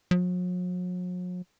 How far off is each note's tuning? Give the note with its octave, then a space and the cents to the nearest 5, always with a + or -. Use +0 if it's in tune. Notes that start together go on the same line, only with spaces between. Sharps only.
F#3 -45